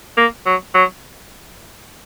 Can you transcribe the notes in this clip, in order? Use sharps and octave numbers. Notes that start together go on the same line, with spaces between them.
A#3
F#3
F#3